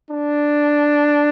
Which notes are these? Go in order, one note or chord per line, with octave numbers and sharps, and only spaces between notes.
D4